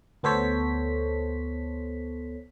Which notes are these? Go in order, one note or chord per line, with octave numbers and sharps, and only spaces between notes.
D2 B3 A4 C5 C#5 B6